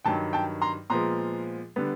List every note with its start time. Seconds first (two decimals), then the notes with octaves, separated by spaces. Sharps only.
0.05 G2 D#3 F#3 G5 A5
0.33 G5 A5
0.62 A#5 C6
0.90 A#2 F3 G#3 B3 A#5 C6
1.76 D3 G3 B3